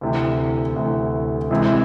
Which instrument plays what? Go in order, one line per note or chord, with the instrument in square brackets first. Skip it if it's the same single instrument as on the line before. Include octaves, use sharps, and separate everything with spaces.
[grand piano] D2 C3 E3
D2 C3 E3
C3 E3 G#3 C4 E4